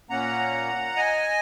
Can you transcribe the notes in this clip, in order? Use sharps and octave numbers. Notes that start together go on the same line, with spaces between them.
A#2 A#3 C#4 F#5 A#5
D#5 G#5